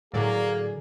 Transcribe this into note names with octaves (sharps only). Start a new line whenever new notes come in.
A2 D3 F#3 A#3 G#4 D5